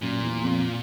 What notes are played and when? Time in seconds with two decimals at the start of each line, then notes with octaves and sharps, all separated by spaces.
0.01 F#2 A#2
0.22 E2
0.44 F2